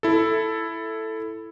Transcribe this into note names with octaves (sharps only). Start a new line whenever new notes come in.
E4 A4